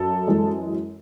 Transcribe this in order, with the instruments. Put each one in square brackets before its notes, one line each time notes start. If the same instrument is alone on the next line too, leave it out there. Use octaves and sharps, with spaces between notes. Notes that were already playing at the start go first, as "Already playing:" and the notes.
Already playing: [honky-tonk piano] F#2 A4
F#2 E3 G#3